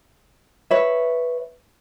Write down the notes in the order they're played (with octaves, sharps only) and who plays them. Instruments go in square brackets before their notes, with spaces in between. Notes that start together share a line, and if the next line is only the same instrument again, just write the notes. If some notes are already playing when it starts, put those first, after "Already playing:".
[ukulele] B4 C#5 E5